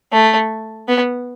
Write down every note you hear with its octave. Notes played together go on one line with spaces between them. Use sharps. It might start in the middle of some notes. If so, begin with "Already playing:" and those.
A3
B3